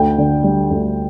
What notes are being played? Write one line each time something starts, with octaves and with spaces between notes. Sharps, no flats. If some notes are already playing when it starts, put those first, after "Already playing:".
Already playing: D2 G5
D3
G3
D2